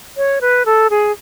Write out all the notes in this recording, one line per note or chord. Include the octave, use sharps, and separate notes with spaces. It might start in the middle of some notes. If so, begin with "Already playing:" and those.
C#5
B4
A4
G#4